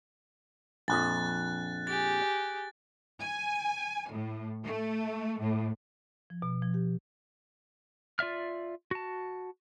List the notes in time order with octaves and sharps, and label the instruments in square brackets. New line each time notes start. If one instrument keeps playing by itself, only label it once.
[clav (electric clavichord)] A#1 F2 [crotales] F#6 A6
[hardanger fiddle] G4 G#4 [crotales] A6
[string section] G#5
A2
A3
A2
[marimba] F3
B2
F3
G4
[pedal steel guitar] F4 D5 E5 F6
F#4 A5